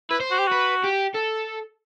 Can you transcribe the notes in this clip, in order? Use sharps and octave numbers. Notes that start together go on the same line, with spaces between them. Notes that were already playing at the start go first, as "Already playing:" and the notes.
E4 B4
C5
F#4
G4
F#4 B4
G4
A4